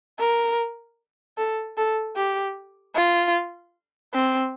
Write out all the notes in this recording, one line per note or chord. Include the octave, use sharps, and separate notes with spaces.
A#4
A4
A4
G4
F4
C4